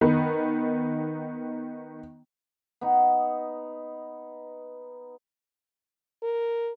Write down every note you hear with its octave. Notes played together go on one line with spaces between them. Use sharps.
D#3 B3 D#4
B3 D#4
A#4